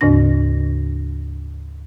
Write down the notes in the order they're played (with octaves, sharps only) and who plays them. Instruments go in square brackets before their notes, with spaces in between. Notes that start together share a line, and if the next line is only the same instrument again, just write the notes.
[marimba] D2 G#2 C#3 D4 A#6